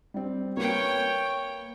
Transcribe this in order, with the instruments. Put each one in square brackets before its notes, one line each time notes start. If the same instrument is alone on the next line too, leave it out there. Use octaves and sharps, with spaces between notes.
[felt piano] G3 C4
[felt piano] A#3 B4 [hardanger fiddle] C#5 G5